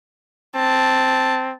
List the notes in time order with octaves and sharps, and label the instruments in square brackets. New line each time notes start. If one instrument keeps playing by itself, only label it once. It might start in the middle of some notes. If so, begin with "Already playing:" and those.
[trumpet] C4 [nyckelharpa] A5